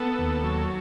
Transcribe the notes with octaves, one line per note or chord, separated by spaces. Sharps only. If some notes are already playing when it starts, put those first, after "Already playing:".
Already playing: B3 A4
D#2
F#3